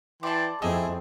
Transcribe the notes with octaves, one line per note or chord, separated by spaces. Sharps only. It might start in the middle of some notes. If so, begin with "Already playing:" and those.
E3 D5 G5 A5 C6
F2 A3 C4 E4 G#4 D#5 E6